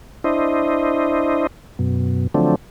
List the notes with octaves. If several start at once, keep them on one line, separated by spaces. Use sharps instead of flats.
D4 E4 C5 D#5
F#2 B2
D3 F3 F#3 A3 C4 D4